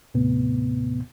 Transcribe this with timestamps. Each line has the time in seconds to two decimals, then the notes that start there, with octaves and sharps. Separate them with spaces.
0.14 D#2 A2 C3 B3